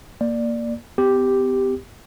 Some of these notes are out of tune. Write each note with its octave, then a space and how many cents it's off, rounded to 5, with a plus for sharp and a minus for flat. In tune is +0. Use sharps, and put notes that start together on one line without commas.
A#3 +0 D5 +5
B3 +45 G4 +0